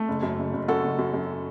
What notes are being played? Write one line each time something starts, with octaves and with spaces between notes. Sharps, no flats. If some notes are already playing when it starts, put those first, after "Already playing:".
Already playing: A3 A4
F#1
F#2
F#1
F#1
F#2 F#4 A4
F#1
F#2
F#2